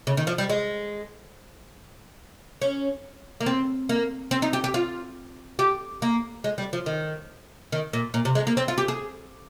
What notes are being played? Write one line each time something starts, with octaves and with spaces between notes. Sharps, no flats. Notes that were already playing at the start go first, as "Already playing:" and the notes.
C#3
D#3
F3
G3
G#3
C#4
A#3
C4
A#3
C4
D#4
G4
G4
F4
G4
A#3
G#3
G3
F3
D#3
D#3
A#2
A#2
C3
G#3
A#3
C4
F4
G4
G#4